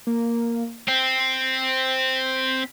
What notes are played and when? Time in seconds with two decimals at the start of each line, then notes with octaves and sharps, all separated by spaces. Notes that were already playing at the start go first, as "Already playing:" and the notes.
0.07 A#3
0.88 C4 B6